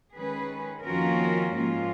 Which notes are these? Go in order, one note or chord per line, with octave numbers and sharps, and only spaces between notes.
D#3 G#3 C#4 G#4 B4
F2 D#3 A#3 C#4 F4 F#4 A#4
G#2 F3 A#3 C#4 F4